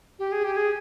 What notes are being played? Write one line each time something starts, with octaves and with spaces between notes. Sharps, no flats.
G4
G#4
G4
G#4